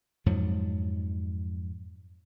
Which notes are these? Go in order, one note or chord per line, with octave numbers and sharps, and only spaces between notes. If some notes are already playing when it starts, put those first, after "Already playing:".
F2 G#2 F3 F#3